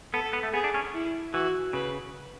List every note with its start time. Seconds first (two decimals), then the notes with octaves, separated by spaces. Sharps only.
0.14 B3 A4
0.33 B3
0.43 A3
0.53 B3 G#4
0.64 D4
0.74 C#4
0.94 E4
1.34 E3 F#4
1.73 C#3 B4